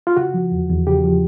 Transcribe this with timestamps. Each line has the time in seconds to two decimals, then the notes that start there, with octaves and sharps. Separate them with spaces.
0.07 F4
0.17 C#3 F#4
0.34 F3
0.51 E2
0.69 E2
0.87 C#3 G4
1.04 F3